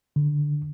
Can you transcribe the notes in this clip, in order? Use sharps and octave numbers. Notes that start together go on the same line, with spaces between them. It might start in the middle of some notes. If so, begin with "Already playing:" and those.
D3